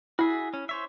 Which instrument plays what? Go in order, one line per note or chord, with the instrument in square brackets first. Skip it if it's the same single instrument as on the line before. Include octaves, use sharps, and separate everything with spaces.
[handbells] E4 [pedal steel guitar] F#4 G#4 E5
[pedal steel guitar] C#4
C5 C#5 E5